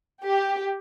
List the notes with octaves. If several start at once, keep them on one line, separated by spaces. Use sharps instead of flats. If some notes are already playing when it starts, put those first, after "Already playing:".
G4